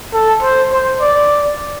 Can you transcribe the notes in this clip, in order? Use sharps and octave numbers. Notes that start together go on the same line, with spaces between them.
A4
C5
C5
D5